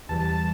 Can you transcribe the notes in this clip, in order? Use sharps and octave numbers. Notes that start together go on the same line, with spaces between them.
E2 E3 G3 A5
A5
A5